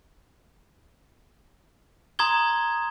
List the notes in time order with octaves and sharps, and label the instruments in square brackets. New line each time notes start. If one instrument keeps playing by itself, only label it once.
[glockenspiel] A#5 C6 D#6 G#6 G7